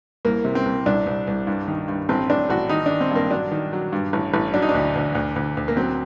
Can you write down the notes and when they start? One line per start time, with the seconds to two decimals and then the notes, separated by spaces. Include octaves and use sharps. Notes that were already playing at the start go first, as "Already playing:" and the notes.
0.25 C2 A#3
0.45 C3
0.55 C4
0.66 C2
0.86 C2 D4
1.07 C2
1.27 C2
1.47 G2
1.68 D#3
1.88 G2
2.09 A1 C4
2.30 A1 D4
2.50 A1 F#4
2.69 D#3 D#4
2.86 D#3 D4
3.01 C4
3.11 G2 A#3
3.31 F#3 D4
3.52 D#3
3.73 F#3
3.92 G2
4.13 A1
4.34 A1
4.54 F#3 D4
4.62 D#4
4.69 D4
4.74 D2
4.95 D2
5.15 D2
5.36 D2
5.57 D2
5.68 A#3
5.77 F#3 C4